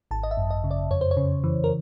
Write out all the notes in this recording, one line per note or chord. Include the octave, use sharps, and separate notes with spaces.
G#1 A5
D#5
E5
F#2
D#5
C#3
D5
F2 C#5
C5
C#5
C#3
E3
A#4